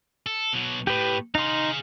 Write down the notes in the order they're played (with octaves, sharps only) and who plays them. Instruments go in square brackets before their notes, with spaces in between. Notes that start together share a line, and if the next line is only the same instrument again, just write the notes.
[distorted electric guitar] A4
B2 F#3
[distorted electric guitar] A2 [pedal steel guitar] G4 B4
[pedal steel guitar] D#4 C6 [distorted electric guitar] G#4 F5